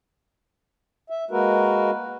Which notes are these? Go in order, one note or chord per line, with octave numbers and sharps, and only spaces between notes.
E5
G#3 A#3 F#4 A#4 B4